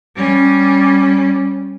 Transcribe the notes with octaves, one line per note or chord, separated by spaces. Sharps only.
G3 C#4